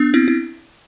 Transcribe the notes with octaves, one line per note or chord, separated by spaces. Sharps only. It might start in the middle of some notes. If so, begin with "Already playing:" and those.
Already playing: B3 D4
C4 E4
E4